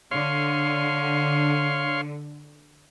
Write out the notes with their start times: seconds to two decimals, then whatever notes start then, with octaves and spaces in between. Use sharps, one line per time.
0.11 D3 C#5 F5 C6